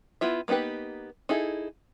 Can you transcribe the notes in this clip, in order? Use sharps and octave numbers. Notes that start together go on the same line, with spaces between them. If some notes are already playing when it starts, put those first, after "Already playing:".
B3 E4 F4 E5
A#3 B3 D#4 G4 B4
D#4 E4 G#4 A4